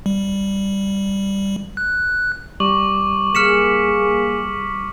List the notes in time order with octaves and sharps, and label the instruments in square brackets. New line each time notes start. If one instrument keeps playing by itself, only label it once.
[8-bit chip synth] G3
F#6
[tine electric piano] G3 [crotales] C#6 D6 F#7
[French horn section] A#3 G#4 [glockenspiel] F6 C#7 E7 [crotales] B6